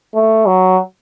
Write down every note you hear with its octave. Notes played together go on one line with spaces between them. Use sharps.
A3
F#3